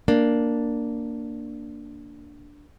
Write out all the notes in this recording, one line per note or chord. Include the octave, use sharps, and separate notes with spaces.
A#3 D4